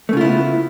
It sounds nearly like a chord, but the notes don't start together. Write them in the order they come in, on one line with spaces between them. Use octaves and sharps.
A3 C#3 F4 E4 B3